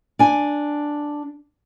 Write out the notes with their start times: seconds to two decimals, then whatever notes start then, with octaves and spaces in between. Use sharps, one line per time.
0.19 D4 G#5